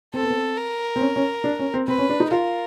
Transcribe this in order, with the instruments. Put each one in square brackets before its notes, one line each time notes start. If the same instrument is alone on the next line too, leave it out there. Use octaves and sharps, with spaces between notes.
[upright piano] C4 [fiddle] A4
[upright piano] B3
C4
[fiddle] A#4
[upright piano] C4
C#4
C#4
D4
C#4
C4
[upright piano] C4 [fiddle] B4
[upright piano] C#4
D4
D#4
[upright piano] F4 [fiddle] A#4